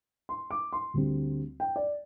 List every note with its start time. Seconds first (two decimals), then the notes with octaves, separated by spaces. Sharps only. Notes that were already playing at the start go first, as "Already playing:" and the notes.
0.29 C6
0.51 D6
0.73 C6
0.94 D2 D3 G3 C4
1.60 G5
1.76 D5